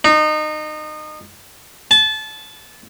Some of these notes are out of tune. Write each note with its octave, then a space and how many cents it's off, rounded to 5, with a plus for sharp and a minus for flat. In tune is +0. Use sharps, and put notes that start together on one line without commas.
D#4 -25
A5 -25